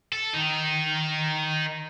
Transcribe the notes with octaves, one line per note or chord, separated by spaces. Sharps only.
A4
D#3 D#4